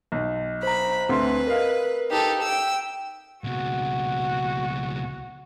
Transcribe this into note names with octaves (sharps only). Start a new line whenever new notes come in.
B1
C5 A#5 B5
D2 A3 C4 B4 C6
A#4 D#5 F5
D#4 G4 A4
G5 E6
C#2 B2 F#4